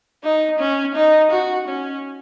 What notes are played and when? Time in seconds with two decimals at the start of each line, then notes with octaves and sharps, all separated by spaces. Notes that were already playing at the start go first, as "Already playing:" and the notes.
0.23 D#4
0.60 C#4
0.96 D#4
1.32 F#4
1.68 C#4